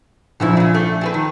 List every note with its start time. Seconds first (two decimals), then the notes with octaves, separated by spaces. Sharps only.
0.40 A#1 F#2 C#3 F3 E4
0.57 A#2 C#3
0.74 A3
1.01 C4 G#4 B4
1.14 D#3